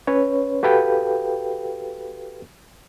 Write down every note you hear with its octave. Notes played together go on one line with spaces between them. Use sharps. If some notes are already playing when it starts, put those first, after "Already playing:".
C#4 B4 C#5
F#4 G4 A4 B4 F5 G5